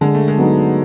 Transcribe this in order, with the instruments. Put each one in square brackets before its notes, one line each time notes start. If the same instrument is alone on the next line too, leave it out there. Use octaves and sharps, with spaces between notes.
[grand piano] D3 [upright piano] G#3
[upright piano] A3
G#3
[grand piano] F#3 B3 D#4